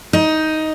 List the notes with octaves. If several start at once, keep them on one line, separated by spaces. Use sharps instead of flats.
D#4